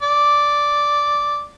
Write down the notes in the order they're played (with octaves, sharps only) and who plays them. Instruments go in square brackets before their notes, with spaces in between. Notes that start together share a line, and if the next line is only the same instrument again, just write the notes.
[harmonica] D5